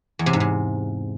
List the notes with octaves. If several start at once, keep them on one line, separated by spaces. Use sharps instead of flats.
E2
C3
G#2
C3